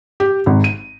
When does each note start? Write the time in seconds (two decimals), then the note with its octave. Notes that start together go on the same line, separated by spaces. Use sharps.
0.20 G4
0.46 G#1
0.64 D#7